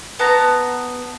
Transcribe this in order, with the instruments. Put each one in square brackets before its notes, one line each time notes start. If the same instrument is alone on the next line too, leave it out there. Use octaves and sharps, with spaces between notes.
[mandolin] B3 A5 A#5